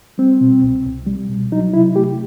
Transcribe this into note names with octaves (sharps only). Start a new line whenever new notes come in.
G3 C4
B2
C2
C2
G3
B2
F#3 D#4
C3 E4
A3 G4